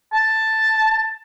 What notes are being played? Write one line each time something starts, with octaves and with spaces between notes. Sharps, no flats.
A5